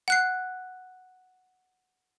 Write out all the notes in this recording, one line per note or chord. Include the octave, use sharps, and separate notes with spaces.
F#5 F#6 C7